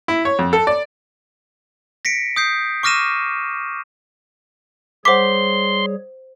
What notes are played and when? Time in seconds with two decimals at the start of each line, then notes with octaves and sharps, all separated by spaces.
0.08 E4
0.25 C#5
0.39 F2
0.53 A4
0.67 D5
2.05 A#6 B6 C#7 D7
2.36 D#6 G6 C7
2.83 C#6 D6 F6 A#6 D#7 E7
5.05 G3 G#4 C5 C#5 F#5 C6 D6 B6